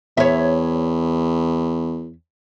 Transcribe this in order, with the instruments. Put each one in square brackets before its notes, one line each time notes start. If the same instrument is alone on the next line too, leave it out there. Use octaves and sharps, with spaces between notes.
[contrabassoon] E2 [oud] C#5 E5